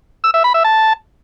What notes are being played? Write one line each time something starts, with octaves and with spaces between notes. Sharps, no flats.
E6
E5
B5
E5
A5